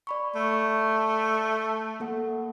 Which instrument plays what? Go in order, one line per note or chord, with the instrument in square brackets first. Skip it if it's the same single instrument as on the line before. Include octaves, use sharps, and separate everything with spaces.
[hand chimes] D5 B5 C#6
[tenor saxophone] A3
[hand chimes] A#3 A4 F#5